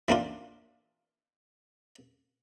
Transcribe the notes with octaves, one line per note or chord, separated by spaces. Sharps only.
E3 A#3 D4 F4